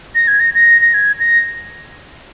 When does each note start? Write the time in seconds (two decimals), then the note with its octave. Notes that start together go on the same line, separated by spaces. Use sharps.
0.15 A#6
0.28 G#6
0.40 A#6
0.55 A#6
0.82 A#6
0.94 G#6
1.20 A#6